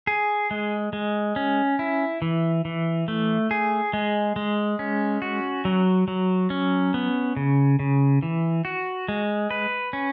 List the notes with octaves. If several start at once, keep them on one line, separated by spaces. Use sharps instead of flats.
G#4
G#3
G#3
C#4
E4
E3
E3
A3
G#4
G#3
G#3
C#4
F#4
F#3
F#3
C#4
B3
C#3
C#3
E3
F#4
G#3
B4
C#4